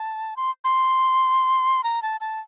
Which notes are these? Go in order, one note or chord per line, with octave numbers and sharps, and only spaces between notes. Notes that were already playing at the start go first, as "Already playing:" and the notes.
Already playing: A5
C6
C6
A#5
A5
A5